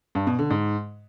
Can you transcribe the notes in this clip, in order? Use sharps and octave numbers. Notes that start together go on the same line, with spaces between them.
G2
B2
D3
G#2